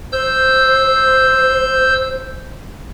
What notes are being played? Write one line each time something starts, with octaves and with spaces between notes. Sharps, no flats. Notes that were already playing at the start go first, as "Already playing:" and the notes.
C5 E6 G6